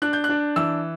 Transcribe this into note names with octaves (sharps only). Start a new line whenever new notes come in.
D4 F#6
G6
F#6
D4
E3 E6